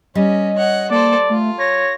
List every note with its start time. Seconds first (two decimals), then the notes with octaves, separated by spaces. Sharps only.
0.15 G3 C#4 D#5
0.58 C#5 F#5
0.91 A#3 A4 C5 D5
1.29 A3 F4
1.59 C#5 A#6